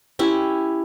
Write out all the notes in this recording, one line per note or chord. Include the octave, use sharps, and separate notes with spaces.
C#4 E4 G4